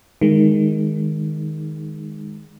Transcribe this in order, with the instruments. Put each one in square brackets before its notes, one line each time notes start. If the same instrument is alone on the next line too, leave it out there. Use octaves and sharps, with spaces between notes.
[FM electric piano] D#3 G#3